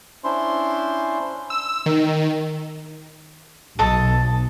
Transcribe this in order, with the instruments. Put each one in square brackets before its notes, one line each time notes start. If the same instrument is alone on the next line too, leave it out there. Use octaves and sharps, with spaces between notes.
[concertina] C#4 D4 E4 C5 C6
[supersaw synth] E6
D#3
[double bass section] B1 [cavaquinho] A4 D#5 A5